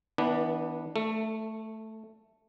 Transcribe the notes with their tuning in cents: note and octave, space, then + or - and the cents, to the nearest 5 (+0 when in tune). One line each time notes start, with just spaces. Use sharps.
E3 -40 B3 -10 D4 +0
A3 +0 A4 +30